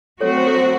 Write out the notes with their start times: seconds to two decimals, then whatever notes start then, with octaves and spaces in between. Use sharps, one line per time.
0.21 F#3 A3 C4 F#4 A4 C#5
0.37 C5
0.47 A4
0.54 C5